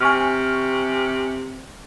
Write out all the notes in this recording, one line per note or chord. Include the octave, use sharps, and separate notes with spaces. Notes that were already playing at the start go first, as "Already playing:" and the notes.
C3 G#5 C#6 F6